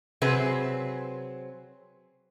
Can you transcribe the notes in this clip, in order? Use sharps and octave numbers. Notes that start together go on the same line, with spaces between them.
C3 F#3 C4 G#4 B4